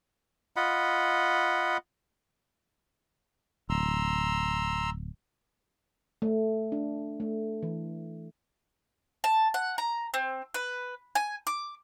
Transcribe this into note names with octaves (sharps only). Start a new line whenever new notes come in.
F4 D#5 F#5 B5
D1 A#5 C6 E6
A3
D4
A3
E3
A5
F#5
A#5
C4
B4
G#5
D6